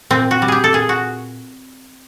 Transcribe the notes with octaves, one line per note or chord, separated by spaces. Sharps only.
A#2 C4
F#4
G3
G4 G#4
A4
A#2 G#4
F#4